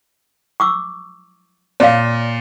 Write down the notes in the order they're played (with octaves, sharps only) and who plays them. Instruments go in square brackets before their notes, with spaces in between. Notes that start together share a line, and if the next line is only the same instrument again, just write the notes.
[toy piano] C#6 D6 E6
[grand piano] A#2 [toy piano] C#5 D5 F5